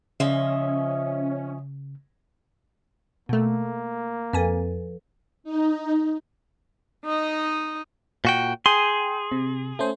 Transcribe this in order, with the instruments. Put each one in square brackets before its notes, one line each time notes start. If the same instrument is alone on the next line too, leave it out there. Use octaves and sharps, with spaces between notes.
[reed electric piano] C#3 [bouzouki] F3 D#5 E5 [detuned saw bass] C#4
[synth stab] B2 A3 [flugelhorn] A#3
[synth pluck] F2 G#5 [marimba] F3 A4 B4
[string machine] D#4
[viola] D#4 D#5
[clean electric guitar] A#2 F#4 G5
[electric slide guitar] G#4 [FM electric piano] G5 [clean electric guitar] C6
[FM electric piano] C3
A3 C#4 C5